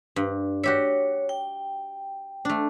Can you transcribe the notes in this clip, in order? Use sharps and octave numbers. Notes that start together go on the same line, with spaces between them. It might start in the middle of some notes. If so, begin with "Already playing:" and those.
G2
F#4 G4 C#5 E5
G5
A3 D4